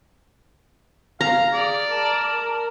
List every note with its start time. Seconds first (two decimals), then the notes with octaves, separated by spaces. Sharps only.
1.21 F5 A#5
1.53 G#4 D5
1.91 A#4 A5